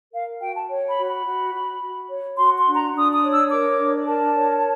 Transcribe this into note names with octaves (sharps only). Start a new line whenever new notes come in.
A#4 F5
F#4 G5
A5
C#5
B5
F#4
B5
F#4
F#4
F#4
C#5
F#4 C6
C6
D4
A#5
D4 D#6
D#6
C#5
E6
A#4 D6
D4
A#4 A5
C#5